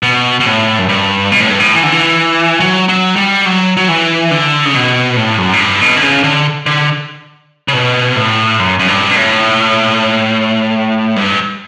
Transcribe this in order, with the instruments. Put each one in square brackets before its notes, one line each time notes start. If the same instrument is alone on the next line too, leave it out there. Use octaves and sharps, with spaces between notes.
[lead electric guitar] B2
B2
A2
F#2
G2
B2
A2
G2
A2
E3
D3
E3
F#3
F#3
G3
F#3
F#3
E3
D3
C#3
B2
A2
F#2
A2
G2
B2
D3
C#3
D3
D3
C#3
B2
A2
F#2
F#2
G2
B2
A2
G2